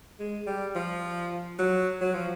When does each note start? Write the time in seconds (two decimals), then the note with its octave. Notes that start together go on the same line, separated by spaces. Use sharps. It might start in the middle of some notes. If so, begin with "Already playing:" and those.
0.19 G#3
0.47 G3
0.75 F3
1.59 F#3
2.01 F#3
2.14 F3